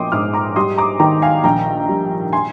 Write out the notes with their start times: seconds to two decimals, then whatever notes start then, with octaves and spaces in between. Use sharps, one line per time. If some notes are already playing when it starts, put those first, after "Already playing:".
Already playing: A#1 A#3 D#5 G5 C6 D6 D#6
0.12 G#2 D6 F6
0.34 A#5 D6
0.56 G3 C6 D#6
0.77 A#5 D6
1.00 D#3 G5 A#5
1.22 F5 G#5
1.44 A#1 G5 A#5
1.89 G3
2.33 G#5 C6